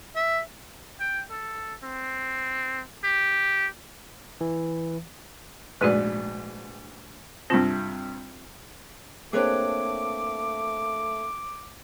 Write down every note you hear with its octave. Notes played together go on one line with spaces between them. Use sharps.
E5
G5
A4
C4
G4
E3
A#1 G#2 A3 F#4 B4 D5
G2 C3 C4 F4 C5
A3 A#3 C4 D4 G#4 B4 C#5 D6